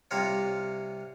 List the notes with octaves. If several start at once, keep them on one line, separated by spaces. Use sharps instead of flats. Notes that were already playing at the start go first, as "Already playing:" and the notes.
C2 C3 A#3 F4 A#4 C#5